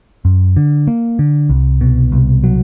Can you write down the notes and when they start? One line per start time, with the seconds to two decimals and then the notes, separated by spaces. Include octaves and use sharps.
0.25 F#2
0.57 D3
0.87 A#3
1.19 D3
1.49 C2
1.81 B2
2.12 C2
2.44 F#3